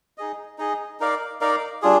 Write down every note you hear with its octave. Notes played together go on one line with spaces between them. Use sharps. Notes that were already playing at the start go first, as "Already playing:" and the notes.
D#4 G#4 D#5
D#4 G#4 D#5
D#4 A#4 D5 F5
D#4 A#4 D5 F5
G3 D4 F4 G#4